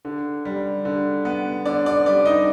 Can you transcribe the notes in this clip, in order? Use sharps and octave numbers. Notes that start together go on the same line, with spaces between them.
D3
G3
D3
B3
D3 D5
D5
G3 D5
D#4 D#5